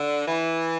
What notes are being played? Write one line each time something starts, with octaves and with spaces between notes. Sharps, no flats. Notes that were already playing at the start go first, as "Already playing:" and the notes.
Already playing: D3
E3